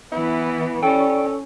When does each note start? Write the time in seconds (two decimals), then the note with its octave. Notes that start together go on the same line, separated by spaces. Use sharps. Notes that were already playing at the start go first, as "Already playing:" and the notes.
0.12 E3 B3 E4
0.83 C#4 A4 D5 G5